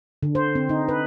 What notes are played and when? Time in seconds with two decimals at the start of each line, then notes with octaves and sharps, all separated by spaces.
0.23 D3
0.35 C5
0.55 C4
0.69 D#4
0.88 B4